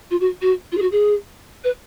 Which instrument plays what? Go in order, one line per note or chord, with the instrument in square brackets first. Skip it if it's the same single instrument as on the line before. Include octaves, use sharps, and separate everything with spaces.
[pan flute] F4
F#4
F#4
F4
G#4
F#4
G#4
B4